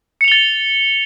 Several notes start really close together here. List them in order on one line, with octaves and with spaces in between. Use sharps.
C#7 F7 G7 A6